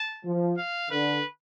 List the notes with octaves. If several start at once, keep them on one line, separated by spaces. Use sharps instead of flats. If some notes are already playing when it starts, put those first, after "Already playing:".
Already playing: A5
F3
F5
D3 B4